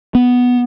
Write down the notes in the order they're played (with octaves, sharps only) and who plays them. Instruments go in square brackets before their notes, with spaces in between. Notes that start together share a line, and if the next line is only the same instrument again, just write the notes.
[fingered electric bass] B3